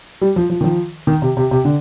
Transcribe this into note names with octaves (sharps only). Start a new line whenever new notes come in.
G3
F3
F3
D#3
F3
D#3
C3
C3
C3
D3